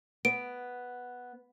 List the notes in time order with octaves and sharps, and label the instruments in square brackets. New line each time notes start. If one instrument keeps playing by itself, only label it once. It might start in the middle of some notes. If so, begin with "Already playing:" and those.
[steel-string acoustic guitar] B3 [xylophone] D7